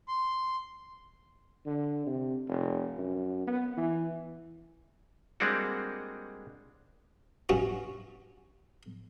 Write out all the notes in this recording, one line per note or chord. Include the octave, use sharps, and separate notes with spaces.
C6
D3
C3
F1
F#2
B3
E3
G3 G#3 A#3 C4 D4 F#4
G2 C#4 F#4